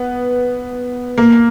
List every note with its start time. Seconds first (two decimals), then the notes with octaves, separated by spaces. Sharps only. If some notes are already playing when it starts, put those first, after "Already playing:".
Already playing: B3
1.18 A#3